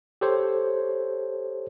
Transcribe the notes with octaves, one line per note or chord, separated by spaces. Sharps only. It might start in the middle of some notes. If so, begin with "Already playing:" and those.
G4 A4 C5 C#5